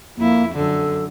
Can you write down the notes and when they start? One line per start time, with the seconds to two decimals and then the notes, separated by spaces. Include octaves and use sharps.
0.17 F2 A#3 E4
0.55 F#2 D3 A4